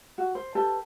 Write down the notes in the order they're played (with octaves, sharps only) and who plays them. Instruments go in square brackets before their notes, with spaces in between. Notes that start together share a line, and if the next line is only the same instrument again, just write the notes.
[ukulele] F#4
C5
G4 A4 B4 A5